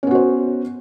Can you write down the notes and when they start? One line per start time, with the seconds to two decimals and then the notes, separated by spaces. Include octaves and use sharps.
0.03 C#4
0.07 B3
0.11 F#4
0.15 C5